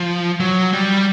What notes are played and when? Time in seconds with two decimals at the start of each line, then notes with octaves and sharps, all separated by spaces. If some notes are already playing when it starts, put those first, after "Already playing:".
Already playing: F3
0.40 F#3
0.73 G3